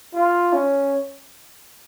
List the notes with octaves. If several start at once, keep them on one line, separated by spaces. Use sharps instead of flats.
F4
C#4